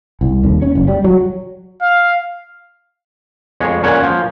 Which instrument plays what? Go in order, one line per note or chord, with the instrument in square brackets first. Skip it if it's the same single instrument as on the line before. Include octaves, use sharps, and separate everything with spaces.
[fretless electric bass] C2
D#2
C#4
F#1
G3
F#3
[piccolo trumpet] F5
[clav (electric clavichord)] F2 G#3 C#5
A#2 C#4 C#5 F#5
F3